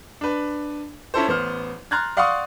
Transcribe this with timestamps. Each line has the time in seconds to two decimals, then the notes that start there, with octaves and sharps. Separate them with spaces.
0.21 D4 B4
1.14 C#4 E4 A4 C5
1.28 A1 B3 C5 F6
1.91 A#5 C6 F6 F#6 G#6 A6
2.17 D5 F5 F#5 C6 C#6 D#6